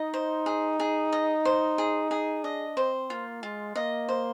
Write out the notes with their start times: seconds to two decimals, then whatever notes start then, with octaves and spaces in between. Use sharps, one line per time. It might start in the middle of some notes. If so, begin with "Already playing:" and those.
Already playing: D#4 D#5
0.14 C5
0.46 G#4
0.80 G#4
1.12 D#5
1.45 C5
1.78 G#4
2.11 G#4
2.44 D4 D#5
2.77 C4 C5
3.10 A#3 F4
3.43 G#3 F4
3.76 A#3 D#5
4.09 C5